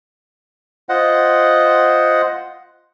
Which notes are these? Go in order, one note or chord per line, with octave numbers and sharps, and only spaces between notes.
F4 C5 D#5 F#5